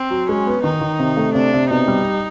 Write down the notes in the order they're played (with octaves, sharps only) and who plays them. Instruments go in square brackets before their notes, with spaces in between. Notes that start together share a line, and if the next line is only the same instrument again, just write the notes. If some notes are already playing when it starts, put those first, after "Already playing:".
Already playing: [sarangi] C4
[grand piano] F#3
[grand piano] G#3 [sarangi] C#4
[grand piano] B3
[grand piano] D#3 [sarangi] D#4
[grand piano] D#3
C3
A3
[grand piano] C3 [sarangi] D4
[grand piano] C3
[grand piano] B2 [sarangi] D#4
[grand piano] G3